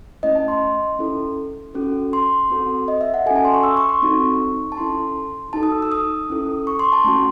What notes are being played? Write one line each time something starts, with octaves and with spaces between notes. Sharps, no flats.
A3 C#4 E4 D#5
A5
C6
C#4 E4 A4
C#4 F#4 A4
C6
C4 F#4 A4
D#5
E5
F#5
C#4 F#4 A4 G#5
A5
C6
C#6
E6
C#6
C6
C4 D#4 F#4 A4 C#6
A5
C#4 E4 A4 C6
D#4 F#4 A4 A5
D#6
E6
E6
D#6
C#4 E4 A4
C#6
C6
A5
A3 C#4 F#4 C6